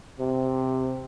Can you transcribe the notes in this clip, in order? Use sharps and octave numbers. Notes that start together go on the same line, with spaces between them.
C3